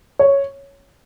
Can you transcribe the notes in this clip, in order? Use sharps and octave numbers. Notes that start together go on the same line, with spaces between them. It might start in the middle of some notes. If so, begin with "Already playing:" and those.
C#5